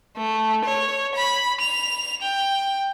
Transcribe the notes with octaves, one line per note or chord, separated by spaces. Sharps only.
A3
C#5
B5
F7
G5